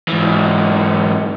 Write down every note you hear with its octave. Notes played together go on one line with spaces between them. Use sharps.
G#2 E3